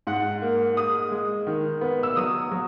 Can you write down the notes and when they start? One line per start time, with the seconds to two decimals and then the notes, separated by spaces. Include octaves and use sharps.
0.07 G#2 F#5
0.42 A#3
0.77 G#3 D#6
1.12 G#3
1.47 D#3
1.81 B3
2.03 E6
2.17 F#3 D#6
2.52 F#3